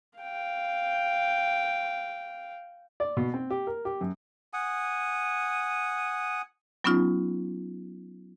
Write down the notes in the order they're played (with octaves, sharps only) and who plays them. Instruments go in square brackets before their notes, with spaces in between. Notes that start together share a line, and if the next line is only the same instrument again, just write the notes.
[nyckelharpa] F5 G5
[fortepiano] D5
B2
C4
G4
A#4
G4
F#2
[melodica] F#5 G#5 D#6
[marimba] F#3 B3 C#4 D#4 F4